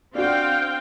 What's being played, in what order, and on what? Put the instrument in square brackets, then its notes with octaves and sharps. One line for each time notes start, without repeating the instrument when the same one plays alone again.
[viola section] C4 F5 G5 [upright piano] D4 F#4